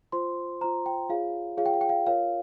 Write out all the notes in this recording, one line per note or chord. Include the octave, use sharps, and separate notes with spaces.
F4 C5 C6
F4 C5 A#5
G5
F4 G#4 C#5 F5
F4 G#4 C#5 F5
G5
F5
G5
F5
F4 A#4 C#5 F5